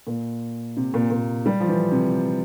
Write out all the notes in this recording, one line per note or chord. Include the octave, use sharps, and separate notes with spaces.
A#2
C3
A#2
A#2
G3
F3
E3
C3